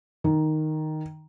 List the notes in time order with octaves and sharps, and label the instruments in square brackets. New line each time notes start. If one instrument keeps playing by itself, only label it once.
[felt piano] D#3